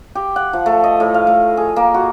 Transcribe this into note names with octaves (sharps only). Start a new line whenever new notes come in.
G4
F#5
F3
A3
D#5
A2
F5
A2
G#4
A#3
F#4